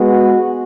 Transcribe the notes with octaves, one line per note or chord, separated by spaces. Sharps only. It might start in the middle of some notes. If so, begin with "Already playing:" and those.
Already playing: G#3 B3 F#4